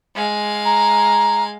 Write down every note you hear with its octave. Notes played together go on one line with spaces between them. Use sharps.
G#3 F5
A#5